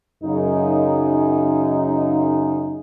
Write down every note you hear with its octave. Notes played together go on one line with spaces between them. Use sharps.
F#2 C#3 D#4